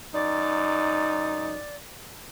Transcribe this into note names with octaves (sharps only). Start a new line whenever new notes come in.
F#2 D#4 D5